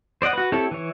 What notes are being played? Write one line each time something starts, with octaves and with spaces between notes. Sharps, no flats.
C5 D5 D#5 F#5
F#4 B4
C4 E4 G4 A4 C#5
E3 C#5